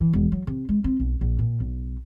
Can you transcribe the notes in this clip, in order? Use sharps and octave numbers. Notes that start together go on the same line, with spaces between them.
E3
E1
F#3
C3
G#3
C4
B1
A#1
A#2
B1